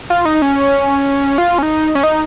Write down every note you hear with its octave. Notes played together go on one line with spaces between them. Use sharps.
F4
D#4
C#4
F4
C#4
D#4
C#4
D#4